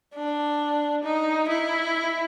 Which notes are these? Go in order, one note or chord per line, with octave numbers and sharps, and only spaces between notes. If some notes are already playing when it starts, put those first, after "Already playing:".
D4
D#4
E4